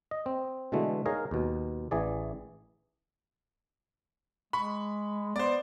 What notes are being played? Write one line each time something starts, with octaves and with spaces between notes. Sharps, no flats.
D#5
C4
B2 D3 E3 G#3 A3
D#4 G#4 A#4 C#5 F5
D#2 B2
A1 E3 G#4 D5
G#3 B5 C#6
B3 C5 D5